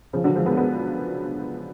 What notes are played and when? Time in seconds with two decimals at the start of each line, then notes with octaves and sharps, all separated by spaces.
0.13 C#3 F3
0.24 D3 F#3
0.35 F3 G#3
0.46 G#3 B3
0.57 G#3 B3